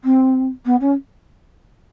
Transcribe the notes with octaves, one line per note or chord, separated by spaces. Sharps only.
C4
B3
C#4